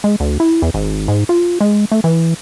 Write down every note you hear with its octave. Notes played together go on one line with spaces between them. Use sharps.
G#3
D2
E4
E2
G#1
G#2
F4
G#3
A3
E3